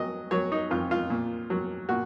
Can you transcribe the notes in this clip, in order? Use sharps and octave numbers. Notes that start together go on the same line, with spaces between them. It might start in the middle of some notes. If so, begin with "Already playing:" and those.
Already playing: F#3 D#5
F#3 C#5
D#4
F2 F4
F4
A#2
F#3
A#2 F#4